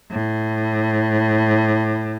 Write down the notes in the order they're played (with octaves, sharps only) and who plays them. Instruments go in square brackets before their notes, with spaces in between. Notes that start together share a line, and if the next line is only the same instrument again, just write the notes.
[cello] A2